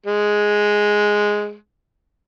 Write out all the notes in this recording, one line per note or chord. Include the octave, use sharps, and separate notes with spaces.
G#3